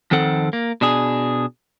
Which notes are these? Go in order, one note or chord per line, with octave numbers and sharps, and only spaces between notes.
F2 D#3 C4 A4 F#5
A#3
B2 D4 G#4